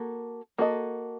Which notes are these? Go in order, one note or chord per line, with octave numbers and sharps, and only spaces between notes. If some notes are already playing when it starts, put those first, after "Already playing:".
Already playing: A#3 F#4 A4
A#3 F#4 A4 D#5